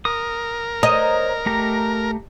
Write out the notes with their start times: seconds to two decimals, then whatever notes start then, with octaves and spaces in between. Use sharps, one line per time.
0.05 A#4 D#6
0.83 C5 C#5 D#5 A#5
1.46 A3 G4 A#5